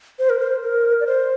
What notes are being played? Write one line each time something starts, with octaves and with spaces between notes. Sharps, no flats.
C5
A#4
C5
A#4
D5
C5